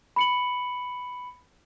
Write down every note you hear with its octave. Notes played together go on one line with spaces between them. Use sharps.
B5 C#7 F#7